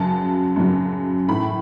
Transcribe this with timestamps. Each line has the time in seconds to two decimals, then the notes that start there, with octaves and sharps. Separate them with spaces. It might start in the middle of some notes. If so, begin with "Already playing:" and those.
Already playing: F#2 C#3 F#3 A5
0.56 F#2 C#3 F#3
1.28 A2 E3 B5